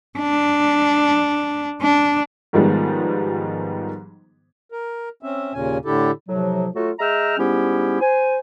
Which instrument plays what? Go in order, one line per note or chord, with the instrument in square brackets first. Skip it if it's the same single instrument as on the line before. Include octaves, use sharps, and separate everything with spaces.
[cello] D4
D4
[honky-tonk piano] G#2 D#3 F3 G3 G#3 B3
[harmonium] A#4
C4 C#4 E5
D#2 A#2 C#3 C#4 G#5
A2 D3 D4 E4 G4 A4
[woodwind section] A2 C3 F3 F#3
F#3 A3 F4 F#4 A4
G#3 E5 G5 A#5 E6 F6
G#2 G3 B3 C#4 E4 G4
C5 G#5